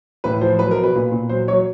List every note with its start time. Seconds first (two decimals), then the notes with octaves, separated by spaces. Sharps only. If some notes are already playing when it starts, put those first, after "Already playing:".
0.24 A2 B4
0.41 F3 C5
0.59 F#3 B4
0.71 A#4
0.77 B2
0.83 B4
0.95 A#2
1.12 A#2
1.29 F#3 C5
1.48 F#3 C#5